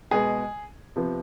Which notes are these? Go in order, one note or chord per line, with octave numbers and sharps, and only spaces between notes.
B2 G#3 B3 G#4
C3 F3 B3